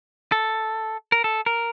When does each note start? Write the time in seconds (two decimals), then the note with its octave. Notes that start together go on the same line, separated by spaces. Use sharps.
0.32 A4
1.12 A#4
1.24 A4
1.46 A#4